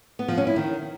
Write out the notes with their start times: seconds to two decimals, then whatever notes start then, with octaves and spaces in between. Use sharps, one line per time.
0.19 B3
0.28 F3
0.38 C#4
0.47 E4
0.56 D#3